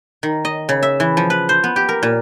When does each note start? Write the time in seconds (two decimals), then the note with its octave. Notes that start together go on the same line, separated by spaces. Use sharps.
0.23 D#3
0.45 D#5
0.69 C#3
0.83 E5
1.00 E3
1.17 F3
1.30 B4
1.49 C5
1.64 B3
1.76 G4
1.89 A#4
2.03 A#2